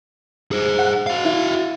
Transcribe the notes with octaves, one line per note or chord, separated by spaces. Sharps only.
G#4 C5
F#5
F#4 F5
E4